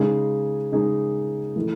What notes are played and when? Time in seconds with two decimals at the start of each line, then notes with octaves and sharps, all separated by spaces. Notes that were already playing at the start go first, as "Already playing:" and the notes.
Already playing: C#3 G#3 D#4 G#4
0.72 C#3 G#3 D#4 G#4
1.56 E3 A3